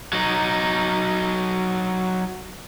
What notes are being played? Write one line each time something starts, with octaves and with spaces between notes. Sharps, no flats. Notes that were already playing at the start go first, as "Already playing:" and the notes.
F#3 D#4